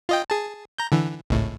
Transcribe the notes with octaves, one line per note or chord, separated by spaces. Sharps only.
F4 D#5 G5
G#4 A5
A#5 G6
D3 E3
G#1 C#2 A2